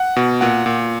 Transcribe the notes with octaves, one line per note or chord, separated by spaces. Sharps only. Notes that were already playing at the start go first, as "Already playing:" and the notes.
Already playing: F#5
B2
A#2 F#5
A#2